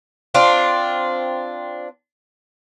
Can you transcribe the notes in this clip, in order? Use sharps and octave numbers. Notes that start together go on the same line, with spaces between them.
C4 D4 F4